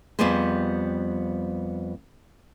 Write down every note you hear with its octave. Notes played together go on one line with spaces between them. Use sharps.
F2 G3 B3 G4 G#4 C5